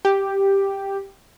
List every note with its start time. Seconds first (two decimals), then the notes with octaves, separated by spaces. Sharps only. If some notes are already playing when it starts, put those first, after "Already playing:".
0.05 G4